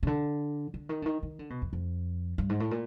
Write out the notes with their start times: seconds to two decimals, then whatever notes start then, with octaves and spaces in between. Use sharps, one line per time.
0.03 C#3
0.07 D3
0.74 D3
0.89 D#3
1.02 D3
1.06 D#3
1.23 D#3
1.39 D3
1.50 B2
1.62 F2
1.73 F2
2.38 G2
2.49 G#2
2.60 A2
2.71 A#2